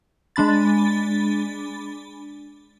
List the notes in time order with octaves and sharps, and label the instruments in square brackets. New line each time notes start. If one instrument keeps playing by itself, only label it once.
[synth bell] G#3 D4 B5 A6